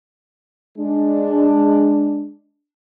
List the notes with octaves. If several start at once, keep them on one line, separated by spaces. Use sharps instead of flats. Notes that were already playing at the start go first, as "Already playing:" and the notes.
G#3 D4